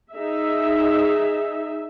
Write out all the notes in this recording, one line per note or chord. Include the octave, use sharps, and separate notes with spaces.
D#4 G#4 E5